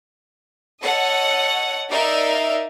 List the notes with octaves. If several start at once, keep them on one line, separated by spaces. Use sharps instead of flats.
A4 C#5 D#5 F#5
D#4 A#4 D5 E5 F5